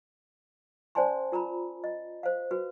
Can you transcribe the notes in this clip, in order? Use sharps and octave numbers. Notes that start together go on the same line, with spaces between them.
C#4 C5 D5 G#5 A5 C6
F4 A#4 A#5 B5
D#5
C5 F5
F#4 B4